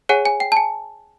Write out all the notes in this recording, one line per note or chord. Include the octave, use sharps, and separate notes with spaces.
G#4 C#5 F#5 G#5
G#5
G5
A5
G#5